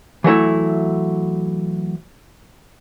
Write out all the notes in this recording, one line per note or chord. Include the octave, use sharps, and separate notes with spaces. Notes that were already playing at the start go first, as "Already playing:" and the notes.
E3 F#3 A3 E4